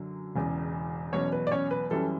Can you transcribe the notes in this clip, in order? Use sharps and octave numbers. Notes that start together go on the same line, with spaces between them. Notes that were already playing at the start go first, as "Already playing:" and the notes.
Already playing: F#2 D3 F#3
E1 E2 C#3
E2 B2 F#3 C#4 C#5
B4
D5
C#4 C#5
B4
F#2 E3 G3 C#4 A4